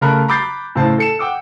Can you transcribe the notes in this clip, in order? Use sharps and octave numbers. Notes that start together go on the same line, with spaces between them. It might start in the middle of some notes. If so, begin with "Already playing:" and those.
C#3 A3 A#4 A#5 B5 F#6
A#5 B5 D6 G6 A6 C7
A2 C#3 C5 A5
A4 C#7 E7
F#5 G5 D6 E6